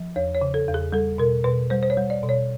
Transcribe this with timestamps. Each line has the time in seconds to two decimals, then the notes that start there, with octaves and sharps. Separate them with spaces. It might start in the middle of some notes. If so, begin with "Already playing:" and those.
Already playing: F3
0.16 E2 C#5
0.35 C#5
0.41 C#3
0.54 A4
0.68 E2
0.74 G#4
0.92 G3 A4
1.18 B2 A#4
1.44 B2 B4
1.70 G3 C5
1.83 C5
1.90 C#5
1.97 G3
2.10 D5
2.23 B2
2.29 C#5